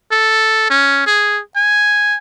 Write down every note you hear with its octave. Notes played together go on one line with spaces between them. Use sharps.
A4
C#4
G#4
G#5